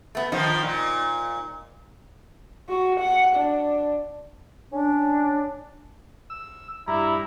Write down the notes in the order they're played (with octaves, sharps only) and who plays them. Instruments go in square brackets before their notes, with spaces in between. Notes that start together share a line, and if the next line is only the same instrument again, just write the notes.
[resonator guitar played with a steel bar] A3 B3
[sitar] D#3 F3 [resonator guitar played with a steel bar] D#4
[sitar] A#2
[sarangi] F#4
F#5
D4
[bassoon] C#4 [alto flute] D4
[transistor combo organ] E6
[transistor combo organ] G2 [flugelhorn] E4 [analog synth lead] A#5